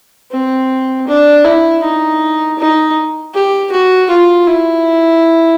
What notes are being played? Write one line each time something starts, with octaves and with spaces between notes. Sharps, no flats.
C4
D4
E4
D#4
D#4
G4
F#4
F4
E4